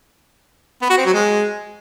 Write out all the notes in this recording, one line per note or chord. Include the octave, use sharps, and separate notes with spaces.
B3
F#4
C4
F#3
G#3